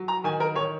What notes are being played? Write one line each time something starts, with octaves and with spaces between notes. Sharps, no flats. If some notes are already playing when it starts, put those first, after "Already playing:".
Already playing: F#3
A#5
D#3 G#5
A#4
D#3 C#5